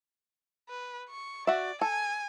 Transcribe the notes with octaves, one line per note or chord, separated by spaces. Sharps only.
B4
C#6
F#4 D5 E5
A4 G#5